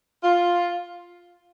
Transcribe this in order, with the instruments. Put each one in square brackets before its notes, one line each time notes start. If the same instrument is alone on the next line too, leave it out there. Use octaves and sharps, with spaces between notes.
[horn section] F4